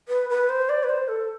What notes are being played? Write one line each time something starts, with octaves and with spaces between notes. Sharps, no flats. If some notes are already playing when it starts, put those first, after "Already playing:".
B4
B4
C5
D5
B4
C5
A4